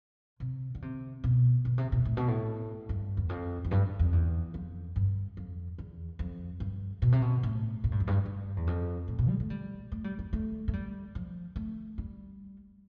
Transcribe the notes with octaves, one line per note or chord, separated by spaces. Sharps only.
C3
D3
C3
B2
B2
C3
B2
A2
B2
A2
G2
E2
F2
F2
G2
F2
E2
F2
G2
F2
E2
F2
G2
B2
C3
B2
A2
A2
G2
F2
G2
G2
E2
F2
A2
B2
G3
A3
G3
A3
G3
G3
A3
A3
G3
F3
A3
G3